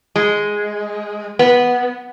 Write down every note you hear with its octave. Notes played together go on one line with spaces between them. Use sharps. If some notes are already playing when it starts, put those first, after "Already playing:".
G#3
B3